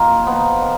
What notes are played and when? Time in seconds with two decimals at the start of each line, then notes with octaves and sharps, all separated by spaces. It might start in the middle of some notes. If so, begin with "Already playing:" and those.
Already playing: D#3 A#3 F4
0.25 F3 B3 D#4
0.62 D#3